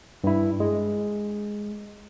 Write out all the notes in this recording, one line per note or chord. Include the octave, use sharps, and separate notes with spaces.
G2 E4
G#3